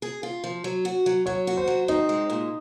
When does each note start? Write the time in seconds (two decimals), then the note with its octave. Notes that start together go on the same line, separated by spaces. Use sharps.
0.02 G#4
0.23 F4
0.44 F3
0.64 F#3
0.85 F#4
1.06 F#3
1.26 F#3 C#5
1.47 F#4
1.57 C5
1.67 F#3
1.88 C4 D#4
2.09 G#3
2.30 A#2